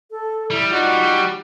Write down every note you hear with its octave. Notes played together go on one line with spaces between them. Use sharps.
A4
G3 E4
D#4 F4 F#4 D5
G4